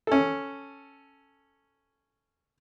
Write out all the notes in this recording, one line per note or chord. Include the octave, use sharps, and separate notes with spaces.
C#4 A4